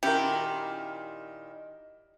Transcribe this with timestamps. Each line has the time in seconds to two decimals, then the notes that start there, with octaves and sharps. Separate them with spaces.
0.03 A#2 D#3 C#4 E4 F#4 G4 A#4